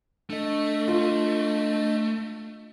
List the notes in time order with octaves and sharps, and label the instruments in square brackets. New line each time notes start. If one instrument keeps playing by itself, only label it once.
[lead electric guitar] A3 [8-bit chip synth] D4 D#5
[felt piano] F4